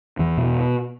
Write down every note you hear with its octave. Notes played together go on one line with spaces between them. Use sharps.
E2 E3
B2